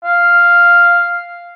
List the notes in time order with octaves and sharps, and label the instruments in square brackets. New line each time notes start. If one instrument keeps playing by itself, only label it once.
[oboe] F5